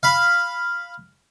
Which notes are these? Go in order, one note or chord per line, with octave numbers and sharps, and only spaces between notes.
F5 B5